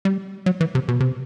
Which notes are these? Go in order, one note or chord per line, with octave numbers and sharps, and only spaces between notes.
G3
F#3
E3
C3
B2
C3